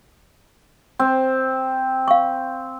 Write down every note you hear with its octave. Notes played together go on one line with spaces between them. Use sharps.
C4
F5 C#6